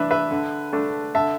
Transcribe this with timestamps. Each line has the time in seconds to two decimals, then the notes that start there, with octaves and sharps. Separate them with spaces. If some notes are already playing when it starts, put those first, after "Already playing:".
Already playing: E3 D4 B4 E5
0.11 B4 E5
0.31 D3
0.73 A3 D4
1.15 D3 E5 A5